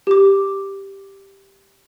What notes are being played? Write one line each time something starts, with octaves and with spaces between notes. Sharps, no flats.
G4 D6